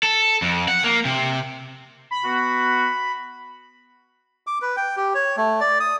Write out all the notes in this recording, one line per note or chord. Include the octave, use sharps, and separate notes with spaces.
A4
F2
F#5
A#3
C3
B5
B3 F#4
D6
B4
G5
G4
C#5
A3
D5
D#6